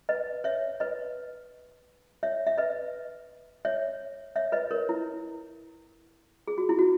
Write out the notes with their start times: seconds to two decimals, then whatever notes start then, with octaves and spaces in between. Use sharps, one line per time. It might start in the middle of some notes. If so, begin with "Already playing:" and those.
0.09 B4 D#5
0.44 C#5 E5
0.80 B4 D#5
2.23 C#5 E5
2.47 E5
2.58 B4 D#5
3.65 C#5 E5
4.36 C#5 E5
4.52 B4 D#5
4.71 A#4 C#5
4.89 E4
6.48 G#4
6.58 F#4
6.69 E4
6.79 F#4